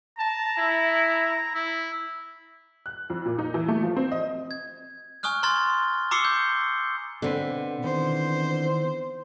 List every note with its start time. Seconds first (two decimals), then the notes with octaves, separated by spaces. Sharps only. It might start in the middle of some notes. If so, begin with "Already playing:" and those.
0.17 A5 A#5
0.57 E4
1.54 E4
2.86 F#6
3.10 F2
3.26 A#2
3.39 D#4
3.54 E3
3.68 A3
3.83 F3
3.97 C4
4.12 D#5
4.51 G#6
5.23 G#5 C#6 D#6 F6 F#6
5.43 A#5 C6 F6 G#6 A6 G7
6.11 A#5 D6 E6 C7 C#7 G7
6.25 G6
7.22 B2 D3 C4 B4
7.84 D#3 E3 B3 C5